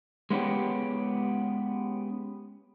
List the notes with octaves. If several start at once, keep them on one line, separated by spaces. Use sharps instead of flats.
G#3 B3 C#4 G4